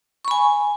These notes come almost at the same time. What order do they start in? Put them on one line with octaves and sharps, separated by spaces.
C#6 B5 G#5